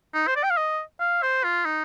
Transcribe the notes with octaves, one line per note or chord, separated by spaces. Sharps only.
D#4
C5
D5
G5
F5
D#5
F5
C5
F4
D#4